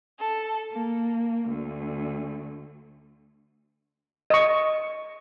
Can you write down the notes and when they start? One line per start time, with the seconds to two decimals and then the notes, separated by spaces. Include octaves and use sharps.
0.18 A4
0.71 A#3
1.50 D2
4.30 D#5 C#6